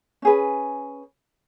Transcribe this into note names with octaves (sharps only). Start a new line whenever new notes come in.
C#4 G#4 B4